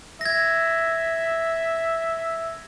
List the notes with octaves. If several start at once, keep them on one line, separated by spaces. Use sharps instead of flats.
E5 G#6 A#6